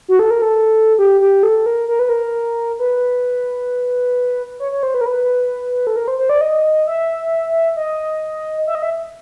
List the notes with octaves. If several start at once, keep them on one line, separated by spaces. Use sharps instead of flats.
F#4
A4
A#4
A4
G4
G4
A4
A#4
A#4
B4
A#4
B4
C#5
C#5
C5
B4
A#4
B4
A4
A#4
C5
C5
D5
D#5
E5
D#5
E5
D#5
E5